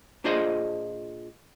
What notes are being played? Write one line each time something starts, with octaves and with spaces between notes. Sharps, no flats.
A#2 D4 F4 G#4 C5 D#5